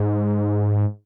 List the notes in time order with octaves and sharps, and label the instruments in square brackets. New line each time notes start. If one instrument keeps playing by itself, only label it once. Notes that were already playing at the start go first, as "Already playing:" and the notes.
Already playing: [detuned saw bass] G#2